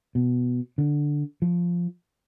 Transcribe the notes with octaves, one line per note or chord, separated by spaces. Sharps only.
B2
D3
F3